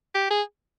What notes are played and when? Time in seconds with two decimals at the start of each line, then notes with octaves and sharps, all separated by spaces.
0.15 G4
0.31 G#4